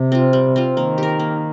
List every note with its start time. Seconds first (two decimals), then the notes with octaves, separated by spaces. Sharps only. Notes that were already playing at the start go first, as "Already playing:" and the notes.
Already playing: C3
0.12 C4 F4
0.33 G3
0.56 C4 F4
0.76 D#3 A#3
0.98 G4 A#4
1.19 A#3